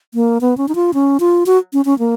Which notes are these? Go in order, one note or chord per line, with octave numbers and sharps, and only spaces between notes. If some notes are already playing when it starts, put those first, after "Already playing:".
A#3
B3
C#4
D#4
F4
C#4
F4
F#4
C#4
C#4
A#3